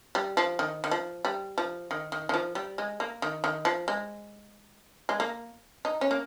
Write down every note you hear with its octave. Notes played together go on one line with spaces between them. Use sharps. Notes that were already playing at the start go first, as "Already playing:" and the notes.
G3
F3
D#3
D#3
F3
G3
F3
D#3
D#3
D#3
F3
G3
G#3
A#3
D#3
D#3
F3
G#3
G#3
A#3
D#4
C#4
A#3